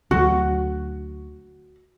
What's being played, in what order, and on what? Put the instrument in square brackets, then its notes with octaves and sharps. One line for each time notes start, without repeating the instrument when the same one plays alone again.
[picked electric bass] D2 F#3 [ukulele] F#4